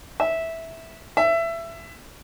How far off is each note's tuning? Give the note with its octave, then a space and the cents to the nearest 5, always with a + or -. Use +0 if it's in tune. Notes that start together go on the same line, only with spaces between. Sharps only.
E5 -10
E5 +20